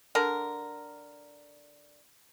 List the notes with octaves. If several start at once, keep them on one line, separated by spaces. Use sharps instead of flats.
D3 A#4